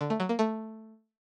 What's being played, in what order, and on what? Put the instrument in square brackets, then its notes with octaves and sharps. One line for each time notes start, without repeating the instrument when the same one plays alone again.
[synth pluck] D3
A3
F#3
A#3
A3